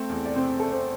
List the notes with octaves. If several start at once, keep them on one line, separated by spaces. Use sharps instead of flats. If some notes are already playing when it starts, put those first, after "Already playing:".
Already playing: A3 C4 A4
E2
D5
C3 C4 C5
A3 A4
C4 C5